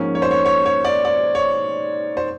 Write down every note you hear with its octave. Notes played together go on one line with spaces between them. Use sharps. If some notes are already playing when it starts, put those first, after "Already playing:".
Already playing: G#2 F3 A#3 C#4
C#5
C5
C#5
C#5
C#5
D5
D5
C#5
C5